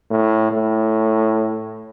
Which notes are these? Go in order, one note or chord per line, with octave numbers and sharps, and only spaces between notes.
A2
A2